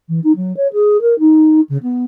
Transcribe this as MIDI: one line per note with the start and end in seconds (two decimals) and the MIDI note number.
0.08 0.19 52
0.23 0.32 63
0.36 0.55 54
0.56 0.67 73
0.73 1.00 68
1.01 1.17 70
1.19 1.60 63
1.69 1.77 49
1.82 2.04 59